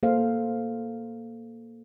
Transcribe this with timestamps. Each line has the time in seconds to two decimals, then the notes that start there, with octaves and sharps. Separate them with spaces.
0.03 A#3 A4 C5 F5